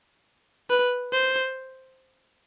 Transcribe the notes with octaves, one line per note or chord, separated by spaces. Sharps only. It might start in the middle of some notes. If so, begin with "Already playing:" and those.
B4
C5